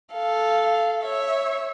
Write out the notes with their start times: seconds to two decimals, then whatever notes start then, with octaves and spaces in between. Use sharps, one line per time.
0.12 A4 F5
1.02 C#5 E5